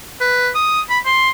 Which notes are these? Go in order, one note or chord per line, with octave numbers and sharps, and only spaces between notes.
B4
D#6
B5
C6